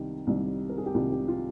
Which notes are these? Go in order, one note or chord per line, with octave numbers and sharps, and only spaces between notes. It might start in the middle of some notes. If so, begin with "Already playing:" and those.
Already playing: C2 C3 D#3 G3 D#4
C2 C3 D#3 G3
A#4
G#4
G4
C2 C3 D#3 G3 F4
G4
F4